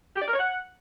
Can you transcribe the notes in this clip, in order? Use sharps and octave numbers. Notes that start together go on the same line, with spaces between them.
G4
D5
A#4
C#5
F#5